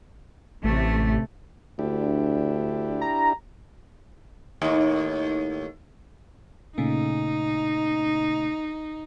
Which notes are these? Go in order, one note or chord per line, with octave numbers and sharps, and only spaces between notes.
A1 C3 A3
D2 D4 E4 G4
A#5
D#2 A2
A#2 C#3 A3 D#4